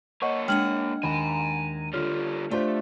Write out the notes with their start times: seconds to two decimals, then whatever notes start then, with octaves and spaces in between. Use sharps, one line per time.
0.22 A#3 C#5 D#5 F#5 C#6
0.48 G#3 D4 F#5 G5 F6 G#6 F#7
1.03 D#2 G#5 A#5 B5
1.93 D3 G3 F4 C#5 F6
2.51 A3 D4 F4 G4 C5 E5